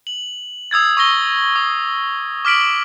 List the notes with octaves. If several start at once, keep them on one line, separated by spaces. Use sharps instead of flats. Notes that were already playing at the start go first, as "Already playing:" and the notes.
F#7
D#6 E6 G#6 A6
C#6 E6 A#6 G7
D#6
D6 F6 B6 D7 F#7